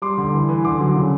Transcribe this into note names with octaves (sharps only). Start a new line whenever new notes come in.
G3 C6 D6
D3
E3
E3
D3 C6 D6
F#3
C#3